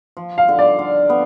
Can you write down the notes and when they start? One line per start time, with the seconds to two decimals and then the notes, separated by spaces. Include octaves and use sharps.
0.17 F3
0.38 F5
0.49 D3
0.59 D5
0.79 D3
1.10 B3